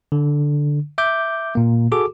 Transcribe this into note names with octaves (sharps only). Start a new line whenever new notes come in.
D3
E5 D6 G6
A#2 A#3
F#4 G#4 A4 D6